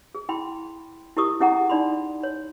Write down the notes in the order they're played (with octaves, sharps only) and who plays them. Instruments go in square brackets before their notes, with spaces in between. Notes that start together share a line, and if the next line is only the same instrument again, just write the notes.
[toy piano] G#4
E4 G5 B5 C6
E4 G4 A#4 C#6 D#6
C#4 E4 G#4 F#5 G5 A#5
D#4 D5 B5 C6
C#5